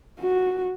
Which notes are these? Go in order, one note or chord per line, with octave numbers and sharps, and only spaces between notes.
F#4